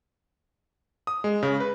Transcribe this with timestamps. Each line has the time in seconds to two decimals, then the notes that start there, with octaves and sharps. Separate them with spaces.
1.07 D#6
1.24 G#3
1.43 C#3
1.60 B4